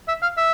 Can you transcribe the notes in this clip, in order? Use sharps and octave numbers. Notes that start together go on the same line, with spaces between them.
E5
F5
E5